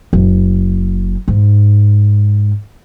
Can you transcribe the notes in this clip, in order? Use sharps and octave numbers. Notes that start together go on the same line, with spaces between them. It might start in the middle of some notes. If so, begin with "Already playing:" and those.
F#1
G#2